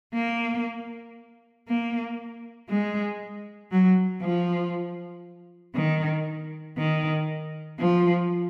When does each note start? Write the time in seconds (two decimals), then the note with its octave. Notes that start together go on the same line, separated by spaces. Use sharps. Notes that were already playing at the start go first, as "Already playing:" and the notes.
0.14 A#3
1.68 A#3
2.69 G#3
3.72 F#3
4.22 F3
5.75 D#3
6.77 D#3
7.80 F3